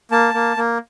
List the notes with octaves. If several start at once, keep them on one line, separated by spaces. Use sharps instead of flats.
A#3 A5
A#3
A#3